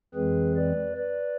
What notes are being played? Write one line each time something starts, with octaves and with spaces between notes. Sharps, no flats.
F2 E3 G#3 C4 G#4 B4
B4 D5
B4 D5